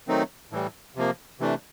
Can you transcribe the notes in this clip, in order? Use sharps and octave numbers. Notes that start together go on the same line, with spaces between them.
D#3 F#3 A3 C4 D#4
A2 E3 G3
C3 F3 A#3
C3 E3 A3 D4